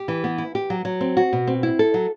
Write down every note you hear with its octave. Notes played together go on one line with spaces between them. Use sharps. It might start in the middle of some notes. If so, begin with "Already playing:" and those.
Already playing: G4
E3
B3
E4
G4
F#3
F#3
C4
F#4
B2
C4
E4
A4
F#3